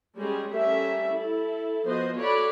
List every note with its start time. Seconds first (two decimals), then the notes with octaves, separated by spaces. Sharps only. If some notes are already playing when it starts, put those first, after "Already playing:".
0.17 G3 G#3 C#4 G#4
0.51 G3 A3 C#4 A#4 E5
1.12 E4 A4
1.85 F3 B3 F#4 C5 D#5
2.17 F#4 A4 C#5 D5 B5